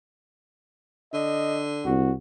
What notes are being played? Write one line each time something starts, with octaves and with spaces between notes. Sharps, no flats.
D3 D#5
C2 F#4